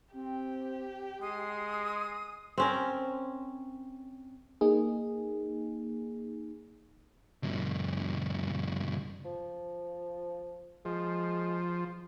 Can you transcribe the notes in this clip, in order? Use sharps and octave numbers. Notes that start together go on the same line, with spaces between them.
C4 G4
G#3 D#6 C7
C4 C#4 A#4
A#3 D#4 G#4
C#2 F#2
F3
F3 G#3